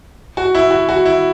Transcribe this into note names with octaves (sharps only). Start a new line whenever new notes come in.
F#4
E4
F#4
F#4
E4